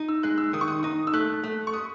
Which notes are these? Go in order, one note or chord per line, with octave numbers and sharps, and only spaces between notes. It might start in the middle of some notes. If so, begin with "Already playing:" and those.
Already playing: D#4
E6
G#3 F#6
E6
D#3 D#6
C#6
D#6
D#4 D#6
E6
A3 F#6
A3
C#6
D#6